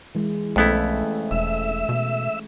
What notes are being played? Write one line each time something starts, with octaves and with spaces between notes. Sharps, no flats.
E3 G#3
B1 F2 A3 B3 C#4 E4 A4
E1 E5
B2